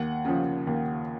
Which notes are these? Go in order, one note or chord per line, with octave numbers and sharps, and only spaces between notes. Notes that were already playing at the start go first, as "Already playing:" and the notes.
Already playing: D#2 F#5
C#3 F3
D#2